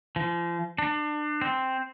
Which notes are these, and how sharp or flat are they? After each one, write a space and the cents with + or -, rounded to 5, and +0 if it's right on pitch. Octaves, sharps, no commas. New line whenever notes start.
F3 -35
D4 +30
C4 +0